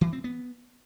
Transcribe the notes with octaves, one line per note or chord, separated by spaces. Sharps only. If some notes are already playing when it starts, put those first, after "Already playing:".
E3
C4
B3